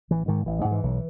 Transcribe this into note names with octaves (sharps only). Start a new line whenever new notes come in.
A1 E3
G#2 D#3
A1 E3
G#3
G#2
E3
B1